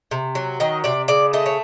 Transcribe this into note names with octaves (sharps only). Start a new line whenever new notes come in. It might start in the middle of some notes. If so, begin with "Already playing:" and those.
C3
F#3
D#3 D#5
C3 D5
C#3 D5
A3 D#5
C#5